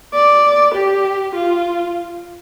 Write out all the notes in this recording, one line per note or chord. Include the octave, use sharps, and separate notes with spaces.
D5
G4
F4